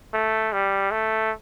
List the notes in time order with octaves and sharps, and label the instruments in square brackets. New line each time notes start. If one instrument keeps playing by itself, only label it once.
[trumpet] A3
G3
A3